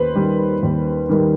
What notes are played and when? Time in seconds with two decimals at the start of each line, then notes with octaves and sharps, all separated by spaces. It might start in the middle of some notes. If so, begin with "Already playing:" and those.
Already playing: D#2 B4 C5
0.15 D#3 G3
0.63 D#2
1.09 D#3 G3